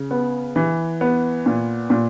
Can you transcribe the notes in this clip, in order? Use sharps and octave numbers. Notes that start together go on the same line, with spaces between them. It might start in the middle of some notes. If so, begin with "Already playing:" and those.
Already playing: C#3
B3
E3
B3
A#2
A#2